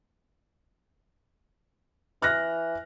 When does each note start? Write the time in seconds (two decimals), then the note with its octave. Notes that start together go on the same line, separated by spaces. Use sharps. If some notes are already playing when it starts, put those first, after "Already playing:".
2.22 E3 F6 F#6 A#6